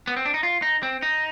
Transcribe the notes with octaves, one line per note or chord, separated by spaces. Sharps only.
B3
C4
D4
D#4
F4
D#4
C4
D#4